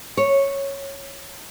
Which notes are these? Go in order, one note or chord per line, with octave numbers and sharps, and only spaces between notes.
C#5